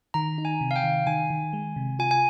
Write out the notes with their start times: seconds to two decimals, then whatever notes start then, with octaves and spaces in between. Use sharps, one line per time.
0.14 D#3 A#5
0.38 D#4
0.45 G#5
0.61 C3
0.71 F5
0.76 G5
0.83 D#3
1.07 D#3 G#5
1.30 D#3
1.53 G#3
1.76 C3
1.99 F4 G#5
2.11 G#5